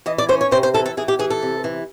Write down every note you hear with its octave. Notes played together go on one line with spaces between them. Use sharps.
E3 D#5
D5
C#4 C5
C#5
C3 C5
C5
E3 A4
A4
E3 G#4
G4
E3 G#4
A4
C3
E3